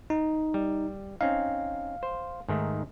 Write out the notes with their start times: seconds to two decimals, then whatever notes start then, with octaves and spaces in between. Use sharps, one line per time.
0.10 D#4
0.54 G3
1.21 C4 C#4 D#4 F5
2.03 C5
2.49 G#2 D#3 A3